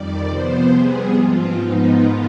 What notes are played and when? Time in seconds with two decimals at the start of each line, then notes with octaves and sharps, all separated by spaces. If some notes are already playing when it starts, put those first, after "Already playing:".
Already playing: F2 D#3 G3 D5
0.26 C3 F3 B3 C5
0.69 C3 G3 B3 G#4
1.12 G#2 F3 C4 F4
1.53 G#2 F3 B3 D#4
1.96 G#2 D#3 B3 F4